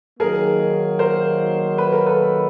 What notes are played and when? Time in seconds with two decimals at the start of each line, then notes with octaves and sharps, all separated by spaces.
0.20 D#3 F#3 A#3 G#4 A#4
0.99 A#4 C5
1.78 B4
1.93 A#4
2.06 A4 B4